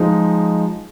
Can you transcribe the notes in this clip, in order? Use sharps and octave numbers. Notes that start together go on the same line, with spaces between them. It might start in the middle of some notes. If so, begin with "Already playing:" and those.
Already playing: F3 G#3 D#4